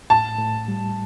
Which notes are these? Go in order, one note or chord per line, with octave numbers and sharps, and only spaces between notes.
A2 A5
A2
G3